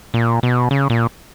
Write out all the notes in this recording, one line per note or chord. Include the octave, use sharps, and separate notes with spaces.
A#2
B2
C#3
A#2